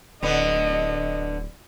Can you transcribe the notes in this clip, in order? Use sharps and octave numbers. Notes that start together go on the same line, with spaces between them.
D1 D3 B3 D#5